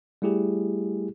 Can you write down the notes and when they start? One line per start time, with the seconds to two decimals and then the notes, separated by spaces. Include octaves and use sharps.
0.22 G3 A3 E4 G4 G#4